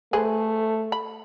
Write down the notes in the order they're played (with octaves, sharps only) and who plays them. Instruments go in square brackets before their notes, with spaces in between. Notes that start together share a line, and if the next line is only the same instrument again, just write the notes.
[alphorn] A3 [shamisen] G#4 B4 C5
[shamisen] B5